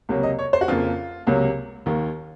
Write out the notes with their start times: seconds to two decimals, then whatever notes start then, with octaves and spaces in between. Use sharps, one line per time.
0.09 C#2 C3 F#3 A#3
0.23 D#5
0.39 C#5
0.53 C5
0.61 F#4
0.68 F2 C#3 F3 A#3 F4
1.27 C#2 C3 F#3 A#3
1.86 D#2 D#3 A#3